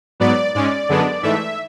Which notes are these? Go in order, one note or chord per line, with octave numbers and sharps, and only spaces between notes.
G#2 F#3 B3 D5
G#2 G#3 C#4 D5
F#2 D3 G#3 B3 D4
G#2 E3 A3 E5